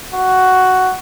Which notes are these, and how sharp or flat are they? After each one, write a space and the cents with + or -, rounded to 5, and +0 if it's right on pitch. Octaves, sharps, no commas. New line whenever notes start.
F#4 +5